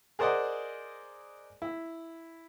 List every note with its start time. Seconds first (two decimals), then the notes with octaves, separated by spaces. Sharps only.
0.19 G#4 A#4 C5 D5 D#5 F#5
1.62 E4